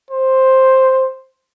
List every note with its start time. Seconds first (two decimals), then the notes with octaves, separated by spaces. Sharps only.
0.11 C5